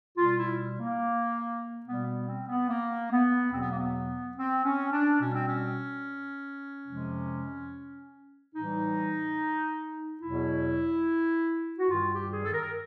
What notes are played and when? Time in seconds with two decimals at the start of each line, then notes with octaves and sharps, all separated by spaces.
0.17 B2 G3 F4
0.38 E4
0.79 A#3
1.84 B2 G3 B3
2.05 B3
2.27 C4
2.48 B3
2.69 A#3
3.11 B3
3.52 E2 B2 F#3 C4
3.61 B3
3.70 A#3
3.78 B3
4.37 C4
4.64 C#4
4.92 D4
5.20 B2 G3 C#4
5.34 C4
5.47 C#4
6.87 F2 C3 F3 G#3
8.54 A2 E3 G3 D#4
10.22 E2 B2 F#3 E4
11.78 F#4
11.90 G2 D#3 G3 F4
12.11 G4
12.32 G#4
12.44 A4
12.52 A#4